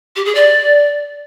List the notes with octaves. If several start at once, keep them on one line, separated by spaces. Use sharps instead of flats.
G4
G#4
D5